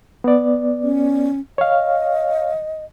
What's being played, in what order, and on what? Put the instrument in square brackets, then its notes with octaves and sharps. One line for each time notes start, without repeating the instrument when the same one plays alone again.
[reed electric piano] B3 D5
[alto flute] C#4
[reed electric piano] C#5 F5 [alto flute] D#5